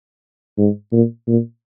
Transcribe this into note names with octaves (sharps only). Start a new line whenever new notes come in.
G#2
A#2
A#2